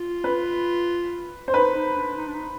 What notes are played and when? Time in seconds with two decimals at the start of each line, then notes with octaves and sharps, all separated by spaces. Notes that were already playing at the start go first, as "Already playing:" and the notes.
Already playing: F4
0.24 B4
1.48 C5
1.53 D#4 B4
1.75 D#4
1.96 D4
2.18 D#4
2.27 D4
2.34 D#4